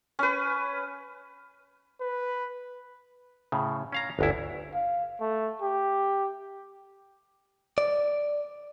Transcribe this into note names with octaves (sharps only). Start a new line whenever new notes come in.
C#4 B4
B4
A2 C#3
C#4 F5 A#5
G1 D2 E4
F5
A3
G4
D5